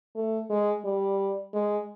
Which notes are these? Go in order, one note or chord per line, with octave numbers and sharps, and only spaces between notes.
A3
G#3
G3
G#3